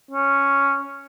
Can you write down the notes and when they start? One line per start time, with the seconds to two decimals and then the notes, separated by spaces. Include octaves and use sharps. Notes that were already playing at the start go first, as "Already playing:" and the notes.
0.11 C#4